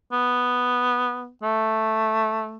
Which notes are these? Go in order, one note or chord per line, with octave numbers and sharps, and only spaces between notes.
B3
A3